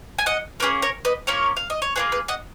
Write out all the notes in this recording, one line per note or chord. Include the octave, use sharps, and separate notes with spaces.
G#5
D#5 F#5
A#3 C#4 G#4 B4
A#4 C#5
B4 D#5
A#3 C#4 F4 A#4 C#5
F5
D#5
C#5
A#3 C#4 F4 G#4 B4
B4
D#5 F#5